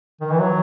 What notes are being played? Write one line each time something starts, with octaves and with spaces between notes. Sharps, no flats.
D#3
E3
F#3